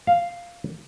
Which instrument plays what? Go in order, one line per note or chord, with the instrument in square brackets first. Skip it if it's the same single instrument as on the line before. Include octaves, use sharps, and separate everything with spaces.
[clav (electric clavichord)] F5